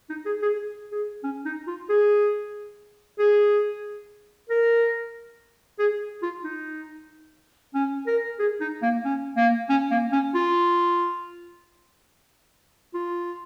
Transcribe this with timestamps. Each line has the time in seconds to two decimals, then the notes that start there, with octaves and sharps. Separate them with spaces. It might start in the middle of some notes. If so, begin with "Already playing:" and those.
0.10 D#4
0.26 G#4
0.42 G#4
0.91 G#4
1.24 C#4
1.45 D#4
1.67 F4
1.89 G#4
3.19 G#4
4.49 A#4
5.79 G#4
6.22 F4
6.44 D#4
7.74 C#4
8.07 A#4
8.39 G#4
8.60 D#4
8.82 A#3
9.05 C#4
9.37 A#3
9.69 C#4
9.91 A#3
10.12 C#4
10.34 F4
12.94 F4